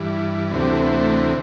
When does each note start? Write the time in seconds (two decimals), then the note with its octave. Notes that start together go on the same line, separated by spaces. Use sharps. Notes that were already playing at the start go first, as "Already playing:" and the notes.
Already playing: G2 E3
0.51 D2 C3 E3 B3
0.62 G3
0.73 A3
0.83 B3
0.93 A3